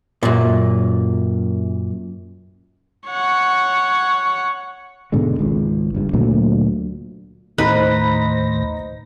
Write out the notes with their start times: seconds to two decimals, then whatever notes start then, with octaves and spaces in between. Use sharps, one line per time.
0.23 F#2 A#2
3.08 C#5 F#5
5.12 G#2 B2 D3 G#3
5.39 G#1 C#2
5.95 F#1 G2
6.13 D2 A#2 F#3 A#3
7.58 D#2 A2 D#4 B4 C5 B5 A#6